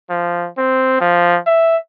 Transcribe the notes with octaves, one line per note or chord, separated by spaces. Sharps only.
F3
C4
F3
E5